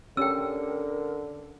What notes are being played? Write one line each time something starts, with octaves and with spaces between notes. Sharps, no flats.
D3 C#4 G4 A4 A#4 G5 E6